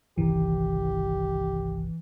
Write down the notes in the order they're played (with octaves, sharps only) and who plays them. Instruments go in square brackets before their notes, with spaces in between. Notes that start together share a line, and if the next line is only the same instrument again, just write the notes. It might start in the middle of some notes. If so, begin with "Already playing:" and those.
[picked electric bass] G1 C2 D#3 [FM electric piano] E3 [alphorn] G4